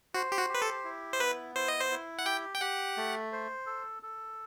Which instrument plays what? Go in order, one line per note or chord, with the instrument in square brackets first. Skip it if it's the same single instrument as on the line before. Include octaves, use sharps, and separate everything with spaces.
[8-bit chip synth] F#4 [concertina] C5
[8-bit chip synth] G4
F#4
[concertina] G4
[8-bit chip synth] B4
A4
[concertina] E4
[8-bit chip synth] C5
[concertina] B3 [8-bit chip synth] B4
[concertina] E4 [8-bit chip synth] C5
[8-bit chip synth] D#5
C5
[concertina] E4
[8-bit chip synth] F#5
[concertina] G4 [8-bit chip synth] G5
[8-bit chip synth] G5
[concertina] G4 [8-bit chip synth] F#5
[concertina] A3
C5
A4
A4